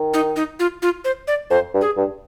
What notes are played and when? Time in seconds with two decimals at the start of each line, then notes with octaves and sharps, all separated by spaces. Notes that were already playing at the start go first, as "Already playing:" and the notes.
Already playing: D#3
0.14 D#4
0.36 D#4
0.59 F4
0.82 F4
1.05 C5
1.28 D5
1.50 F2 C5
1.74 G2
1.81 G#4
1.97 G2